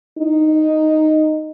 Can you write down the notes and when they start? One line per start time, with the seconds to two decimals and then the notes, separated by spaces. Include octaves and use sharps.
0.18 D#4